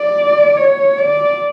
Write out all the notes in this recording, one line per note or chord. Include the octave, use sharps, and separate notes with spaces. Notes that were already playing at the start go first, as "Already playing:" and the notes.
Already playing: D5
C#5
D5